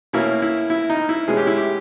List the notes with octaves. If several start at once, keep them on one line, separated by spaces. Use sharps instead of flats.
B2 A#3 C#4 E4
E4
E4
D#4
E4
B2 G#3 C#4 G#4
G4
E4
G4